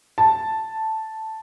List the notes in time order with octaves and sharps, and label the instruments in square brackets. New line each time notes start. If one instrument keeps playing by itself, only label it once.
[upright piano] A5